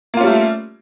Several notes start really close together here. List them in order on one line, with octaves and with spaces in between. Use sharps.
A#3 F4 C#4 G3 A3